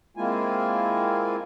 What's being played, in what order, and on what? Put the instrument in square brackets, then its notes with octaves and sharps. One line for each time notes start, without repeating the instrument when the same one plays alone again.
[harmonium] G#3 A#3 C4 E4 F4 G#5